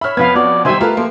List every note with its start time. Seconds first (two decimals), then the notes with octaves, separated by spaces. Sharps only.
0.01 C#5 E5 B5 F6
0.17 F2 B3 B4 F5 G#6
0.36 B3 F#4 D5
0.65 D#3 G3 G4 C5 E5 G#5
0.81 A3 F4 A#4 B4
0.97 F3 A#3